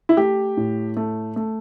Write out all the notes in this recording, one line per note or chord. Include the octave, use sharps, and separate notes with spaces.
E4
A3 G4
A2
A3
A3